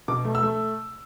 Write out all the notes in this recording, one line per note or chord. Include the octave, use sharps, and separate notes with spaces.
B2 D6
A3
E6
A3